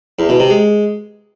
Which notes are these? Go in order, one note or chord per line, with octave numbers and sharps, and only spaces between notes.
E2
B2
C3
G#3